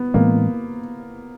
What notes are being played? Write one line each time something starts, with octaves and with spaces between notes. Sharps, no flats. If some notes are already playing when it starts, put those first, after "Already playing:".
Already playing: B3
A2 E3 G#3 A#3 C4